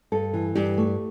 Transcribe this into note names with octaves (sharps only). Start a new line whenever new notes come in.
G2 A4
E3
G2 G4
A3